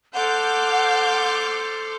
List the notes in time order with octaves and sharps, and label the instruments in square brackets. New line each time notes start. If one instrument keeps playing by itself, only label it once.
[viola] A4 C5 [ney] F#5 [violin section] D6 F6 G6